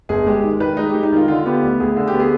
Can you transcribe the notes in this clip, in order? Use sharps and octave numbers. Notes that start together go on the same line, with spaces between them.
G1 G#4
G#3 G4
D#3
D#3 B4
G#3 D#4
G#3 G4
D#4
D#3 F4
D3 F4
B3 G4
D2
D2 G#4
D3
G4
B3
G#4